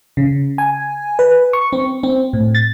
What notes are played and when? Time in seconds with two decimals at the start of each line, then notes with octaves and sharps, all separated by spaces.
0.17 C#3
0.58 G#5
1.19 B4
1.53 C#6
1.73 C4
2.03 C4
2.33 A2
2.55 A6